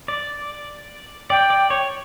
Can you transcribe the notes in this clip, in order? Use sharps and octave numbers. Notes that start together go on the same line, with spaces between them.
D5
D5 G5
D5
C#5